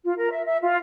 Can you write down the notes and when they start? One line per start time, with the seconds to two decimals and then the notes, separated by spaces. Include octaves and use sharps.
0.05 F4
0.18 A#4
0.31 E5
0.46 E5
0.62 F4